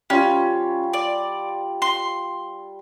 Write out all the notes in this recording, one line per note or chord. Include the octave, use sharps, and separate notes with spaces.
G3 C#4 F4
D5
C6